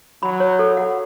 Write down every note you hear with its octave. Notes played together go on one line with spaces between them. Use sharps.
F#3 B5
C#5
A4
F#5